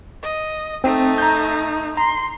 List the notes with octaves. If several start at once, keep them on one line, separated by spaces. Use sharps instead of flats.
D#5
A3 C4 D#4
A#5 G6
A#5 C6